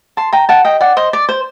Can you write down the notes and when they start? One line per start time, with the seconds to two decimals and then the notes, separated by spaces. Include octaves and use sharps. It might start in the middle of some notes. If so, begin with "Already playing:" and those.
0.17 A5 C6
0.33 G5 A#5
0.49 F#5 A5
0.65 D#5 G5
0.81 D5 F#5
0.97 C5 D#5
1.13 D5
1.29 C5